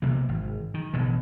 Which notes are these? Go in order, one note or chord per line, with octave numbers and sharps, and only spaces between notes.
B1 C3 A#3
G#1
D#3
A1 G2 B2 D3